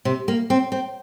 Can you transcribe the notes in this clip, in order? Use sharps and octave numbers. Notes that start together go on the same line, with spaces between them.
C3
A#3
C4
C4